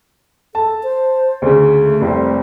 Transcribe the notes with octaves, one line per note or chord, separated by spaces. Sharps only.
A4 A5
C5
D2 C#3
A3
F1 C2 C4